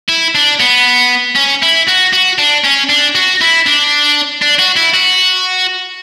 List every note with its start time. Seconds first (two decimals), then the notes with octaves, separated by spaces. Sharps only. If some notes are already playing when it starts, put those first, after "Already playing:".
0.09 E4
0.35 D4
0.60 B3
1.36 C#4
1.62 E4
1.87 F#4
2.13 F#4
2.39 D4
2.65 C#4
2.90 D4
3.15 F#4
3.41 E4
3.66 D4
4.42 D4
4.59 F#4
4.76 E4
4.94 F#4